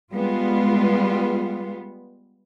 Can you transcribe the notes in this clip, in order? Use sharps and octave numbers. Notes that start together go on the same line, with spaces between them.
G3 G#3 B3 F4